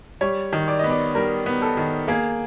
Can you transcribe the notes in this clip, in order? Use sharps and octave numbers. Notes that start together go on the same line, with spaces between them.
G3 C#5
D#3
D5
B3 D#5
D5
G3 A#4
B3
A4
D#3
A#3 G#4